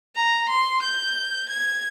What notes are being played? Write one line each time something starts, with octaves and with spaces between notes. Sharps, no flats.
A#5
C6
G6
G#6